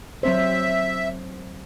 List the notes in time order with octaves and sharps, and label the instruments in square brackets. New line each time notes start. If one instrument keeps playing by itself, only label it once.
[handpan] F#3 C4 C5 [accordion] E5